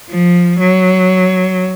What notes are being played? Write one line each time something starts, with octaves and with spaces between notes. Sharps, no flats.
F3
F#3